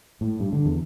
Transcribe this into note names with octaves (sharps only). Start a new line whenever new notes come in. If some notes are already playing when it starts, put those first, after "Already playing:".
A2
G2
D3
E2